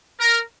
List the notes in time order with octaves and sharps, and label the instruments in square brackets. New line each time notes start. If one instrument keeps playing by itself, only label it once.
[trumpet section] A#4